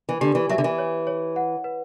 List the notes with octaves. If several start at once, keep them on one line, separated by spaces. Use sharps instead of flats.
E3
D3 G4
E3
F#3 E5
D3
E3
C#5
C#5
F#5
B4